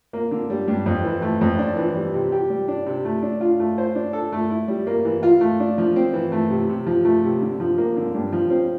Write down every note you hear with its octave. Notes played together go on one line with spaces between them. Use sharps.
A#3
D3
G3
G2
F2
E3
A3
F2
D4
E3
G3
C3
G4
G3
D4
C3
A3
D4
F4
A3
C5
D4
A4
A3
E4
G3
A#3
E3
F4
A3
D4
F3
C4
E3
A3
C3
C3
F3
A3
C3
D3
F3
A#3
D3
G2
F3
C4